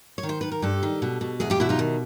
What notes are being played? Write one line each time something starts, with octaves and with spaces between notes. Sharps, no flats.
C#5
D#3
C5
D#3 B4
A#4
G2 G4 A4
D#3
B2
B2
E2 F#4 G#4
F4 G4
B2 E4 F#4
D#4 F4
D#3